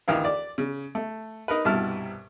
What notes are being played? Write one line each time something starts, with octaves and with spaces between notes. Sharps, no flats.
D2 D#3 E3 A#4 F5
D5
C#3
A3
D#4 A#4 B4
C2 G2 B2 E4 A5 F6